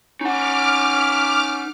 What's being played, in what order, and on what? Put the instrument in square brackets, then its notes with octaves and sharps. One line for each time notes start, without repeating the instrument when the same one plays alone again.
[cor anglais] C#4 [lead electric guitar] D#4 F#5 [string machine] D6 F6